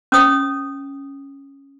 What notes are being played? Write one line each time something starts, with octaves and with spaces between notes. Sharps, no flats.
C#4 D#6